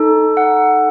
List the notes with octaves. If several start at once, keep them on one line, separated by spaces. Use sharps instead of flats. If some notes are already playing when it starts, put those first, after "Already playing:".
Already playing: D#4 A4
F#5